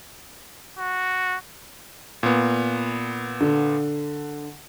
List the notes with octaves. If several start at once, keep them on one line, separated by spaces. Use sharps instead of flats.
F#4
A#2 B3
D3